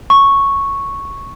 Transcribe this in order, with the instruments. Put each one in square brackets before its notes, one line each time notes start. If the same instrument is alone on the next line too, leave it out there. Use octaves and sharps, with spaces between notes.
[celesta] C#6